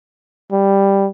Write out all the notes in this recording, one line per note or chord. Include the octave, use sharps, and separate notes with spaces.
G3